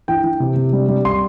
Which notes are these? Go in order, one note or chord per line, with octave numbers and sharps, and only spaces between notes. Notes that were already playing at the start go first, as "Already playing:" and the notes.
E3 G5
E3
C3
C3
G3
G3
C6